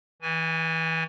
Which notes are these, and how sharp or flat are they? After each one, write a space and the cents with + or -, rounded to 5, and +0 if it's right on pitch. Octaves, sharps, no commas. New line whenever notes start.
E3 -25 G#5 +0